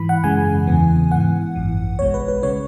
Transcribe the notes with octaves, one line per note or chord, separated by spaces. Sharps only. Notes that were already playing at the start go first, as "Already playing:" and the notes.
Already playing: G#2 E3 B5
F#5
F#2 C#3 E3 G#3 G#5
E2 C#3 E3 B3
G#2 E3 B3 F#5
G#1 F#2 E3
B1 B2 G#3 C#5
B4
B4
C#3 G#3 C#4 C#5